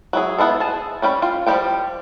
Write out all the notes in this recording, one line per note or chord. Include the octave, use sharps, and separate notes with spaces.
F#3 E4 G#4
B3 E4 F4 A4
G#4 A5
G3 C#4 G5 B5
F4
F3 G3 G4 A4 G5